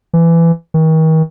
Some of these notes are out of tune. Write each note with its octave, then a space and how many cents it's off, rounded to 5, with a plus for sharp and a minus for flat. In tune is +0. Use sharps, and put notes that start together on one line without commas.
E3 +20
D#3 +40